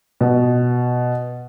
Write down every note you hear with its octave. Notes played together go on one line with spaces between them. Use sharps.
B2